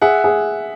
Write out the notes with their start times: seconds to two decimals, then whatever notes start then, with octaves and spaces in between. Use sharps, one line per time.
0.02 G#4 E5 F#5
0.24 G#4